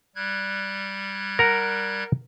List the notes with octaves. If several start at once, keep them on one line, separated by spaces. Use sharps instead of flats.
G3 F#6 G#6
A#4 F#5 A#5